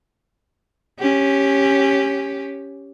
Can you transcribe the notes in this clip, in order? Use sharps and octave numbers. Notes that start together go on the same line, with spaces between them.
C#4 G4